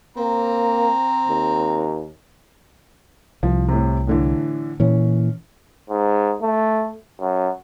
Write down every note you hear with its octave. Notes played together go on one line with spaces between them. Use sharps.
A#3 C4 A#5
D#2
C2 F3
A2 C3
A2 D3 E3
A#2 E3 C#4
G#2
A3
F#2